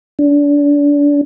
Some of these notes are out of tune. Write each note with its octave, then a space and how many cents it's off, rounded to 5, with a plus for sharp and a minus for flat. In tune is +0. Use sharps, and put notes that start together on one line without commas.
D4 -30